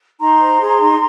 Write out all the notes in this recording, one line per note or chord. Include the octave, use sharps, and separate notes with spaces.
D#4 A#5 C6
C5
G#4
D#4